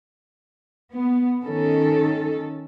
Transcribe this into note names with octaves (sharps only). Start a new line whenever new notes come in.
B3
D#3 C#4 A4